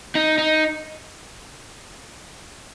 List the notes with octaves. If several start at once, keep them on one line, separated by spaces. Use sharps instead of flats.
D#4
D#4